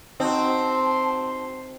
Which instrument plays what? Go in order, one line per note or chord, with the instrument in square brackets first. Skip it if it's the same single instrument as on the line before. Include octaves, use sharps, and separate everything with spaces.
[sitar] C4 [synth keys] D#4 F#4 [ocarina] A5 [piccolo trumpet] C6